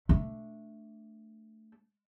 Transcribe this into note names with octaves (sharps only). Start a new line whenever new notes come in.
A3 D4